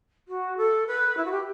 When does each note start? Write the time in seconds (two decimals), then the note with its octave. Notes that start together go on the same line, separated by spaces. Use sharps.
0.28 F#4
0.57 A4
0.87 B4
1.17 E4
1.25 F#4
1.31 G4